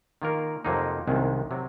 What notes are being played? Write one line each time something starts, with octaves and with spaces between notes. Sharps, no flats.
D#3 A#3 F4 A#4
F2 C3 F#3 A#3 D#4
C2 C3 D#3 G#3 C#4
C3 F#3